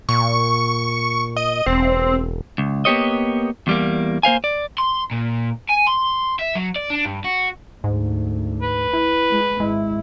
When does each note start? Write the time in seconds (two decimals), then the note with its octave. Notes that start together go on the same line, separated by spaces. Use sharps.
0.09 A#2 C#6
1.36 D#5
1.66 E1 C4
2.58 C#2
2.85 A#3 B3 G4 C#5 D#5
3.67 E2 G3 A#3
4.23 A#3 C5 F5 G#5
4.44 D5
4.78 C6
5.11 A#2
5.69 G#5
5.87 C6
6.39 E5
6.55 F#3
6.76 D5
6.90 D4
7.05 G2
7.25 F#4
7.84 D2 G#2
8.62 B4
8.93 E4
9.30 G#3
9.60 G#1 G#3 E4